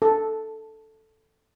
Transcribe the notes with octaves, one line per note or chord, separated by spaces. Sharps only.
A4